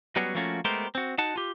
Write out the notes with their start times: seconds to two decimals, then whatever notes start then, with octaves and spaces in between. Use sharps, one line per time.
0.16 F#3 G3 B3 C#4 F#4 G#4
0.35 F3 A3 A#3 C#4 F4 F#4
0.65 G#3 A3 B3 G4 A#4 C5
0.95 C4 F#4
1.18 D#4 F#4 F#5 A5
1.36 F4 G4